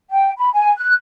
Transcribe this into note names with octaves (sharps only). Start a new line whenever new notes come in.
G5
B5
G#5
F#6